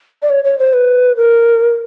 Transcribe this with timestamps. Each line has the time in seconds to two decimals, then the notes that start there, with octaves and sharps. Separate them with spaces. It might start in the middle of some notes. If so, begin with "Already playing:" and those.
0.22 D5
0.30 C#5
0.44 C#5
0.59 C5
0.73 B4
1.17 A#4